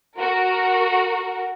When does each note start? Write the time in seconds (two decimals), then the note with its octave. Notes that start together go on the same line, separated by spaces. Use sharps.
0.18 F#4 A#4